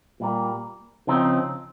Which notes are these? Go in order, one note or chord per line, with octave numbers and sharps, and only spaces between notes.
A#2 G3 A#3
C#3 F3 C4 D#4